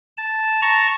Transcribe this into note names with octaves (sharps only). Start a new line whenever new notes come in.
A5
A5 A#5 C#6